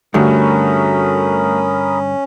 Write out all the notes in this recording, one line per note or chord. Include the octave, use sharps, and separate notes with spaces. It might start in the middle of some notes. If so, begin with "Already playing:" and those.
G2 D3 A3 C#4 F#4 A#4 B5 D#6